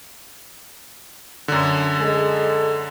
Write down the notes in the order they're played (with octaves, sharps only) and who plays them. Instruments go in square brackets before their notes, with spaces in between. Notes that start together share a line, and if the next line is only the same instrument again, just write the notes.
[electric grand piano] F#2 D3
[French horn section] G#3 G#4 A4